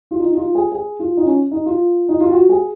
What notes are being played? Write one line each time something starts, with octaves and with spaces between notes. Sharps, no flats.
F4
D#4
D#4
F4
G#4
G#4
F4
D#4
C#4
D#4
F4
D#4
F4
F#4
G#4